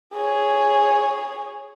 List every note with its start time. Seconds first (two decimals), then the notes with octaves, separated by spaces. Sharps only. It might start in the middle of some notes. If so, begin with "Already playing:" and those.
0.13 G#4 C#5